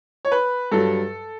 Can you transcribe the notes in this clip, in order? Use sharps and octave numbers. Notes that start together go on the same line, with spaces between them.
C#5
B4
G2 F#3 A4